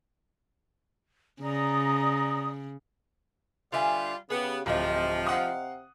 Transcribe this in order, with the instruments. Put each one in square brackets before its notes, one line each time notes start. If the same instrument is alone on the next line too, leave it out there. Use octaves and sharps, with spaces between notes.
[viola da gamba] C#3 [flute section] D5 A#5 D#6
[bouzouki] D3 E5 G#5 [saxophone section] G3 F4
[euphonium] C#3 [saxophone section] B3 [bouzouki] G4 G#4
[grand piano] D1 [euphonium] C3 [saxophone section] F3 [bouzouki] D#5 A#5
[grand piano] F5 F#5 D#6